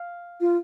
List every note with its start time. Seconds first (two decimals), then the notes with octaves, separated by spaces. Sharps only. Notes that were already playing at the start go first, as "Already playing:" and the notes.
Already playing: F5
0.41 F4